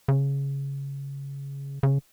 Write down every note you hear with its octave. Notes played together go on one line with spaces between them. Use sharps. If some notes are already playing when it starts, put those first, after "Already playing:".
C#3
C#3